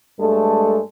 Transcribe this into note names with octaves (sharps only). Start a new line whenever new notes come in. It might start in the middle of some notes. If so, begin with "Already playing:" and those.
G2 G#3 A3 A4